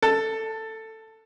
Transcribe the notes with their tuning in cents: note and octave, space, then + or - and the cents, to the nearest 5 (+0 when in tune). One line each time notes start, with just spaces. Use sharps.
A4 +10